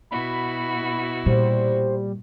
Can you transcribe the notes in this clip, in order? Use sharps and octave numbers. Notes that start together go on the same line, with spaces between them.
B2 E4 F#4 B5
A#2 G3 C5